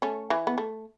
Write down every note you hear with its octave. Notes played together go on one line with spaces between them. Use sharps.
A3 C#4
E3
B3
A3